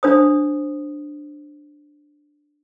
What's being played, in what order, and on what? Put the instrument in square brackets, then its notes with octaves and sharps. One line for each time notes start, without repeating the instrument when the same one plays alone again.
[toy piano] D4 C5 D#6